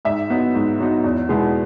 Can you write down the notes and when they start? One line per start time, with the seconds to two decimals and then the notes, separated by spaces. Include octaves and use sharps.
0.05 G#2 E5
0.30 F#3 B3 D#4
0.55 G#2
0.80 F#3 B3 D#4
1.04 E2
1.29 B2 G#3 B3 E4